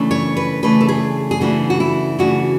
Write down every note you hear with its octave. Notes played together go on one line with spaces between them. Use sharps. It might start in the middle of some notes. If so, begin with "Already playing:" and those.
Already playing: C#3 E3 A3 D4
C#5
B4
C#3 E3 A3 D4 B4
A4
G#4
G#4
C#3 E3 A3 D4 F#4
F#4
E4
C#3 E3 A3 D4 F#4